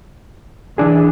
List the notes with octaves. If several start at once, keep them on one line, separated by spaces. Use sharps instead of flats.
E3 D4 G#4